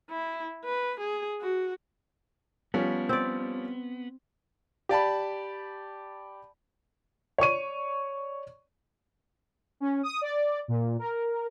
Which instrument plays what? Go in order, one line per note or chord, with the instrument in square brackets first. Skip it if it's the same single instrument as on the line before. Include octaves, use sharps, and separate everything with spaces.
[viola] E4
B4
G#4
F#4
[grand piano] F3 G3 C#4 [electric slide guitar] B3
[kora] C4 D5
[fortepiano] G4 D5 A5 B5
[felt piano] C#5 D5 C#6 D#7
[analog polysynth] C#4
D#6
D5
A#2
A#4